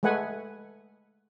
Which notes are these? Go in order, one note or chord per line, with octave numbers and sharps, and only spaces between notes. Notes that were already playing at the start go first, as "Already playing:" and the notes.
G#3 A3 B4 F#5 G#5